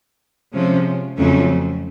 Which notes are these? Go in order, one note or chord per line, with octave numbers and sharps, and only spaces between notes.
C3 F3 G#3 C#4
F2 C#3 F#3 A3 C#4